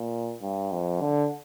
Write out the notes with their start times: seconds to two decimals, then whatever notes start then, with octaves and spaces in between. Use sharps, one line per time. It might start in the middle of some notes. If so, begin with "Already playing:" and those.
Already playing: A#2
0.42 G2
0.72 F2
1.01 D3